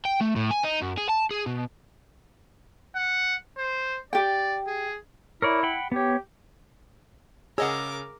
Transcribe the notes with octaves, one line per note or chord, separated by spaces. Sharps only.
G5
A3
A2
G#5
D#4
F#2
G#4
A5
G#4
B2
F#5
C5
G4 D5 G5
G#4
E4 A#4 C#5 D5
F#5 G5 B5
B3 G4 C#5
C#3 G#4 A#4 C#5 D#5 F#5 D6 E6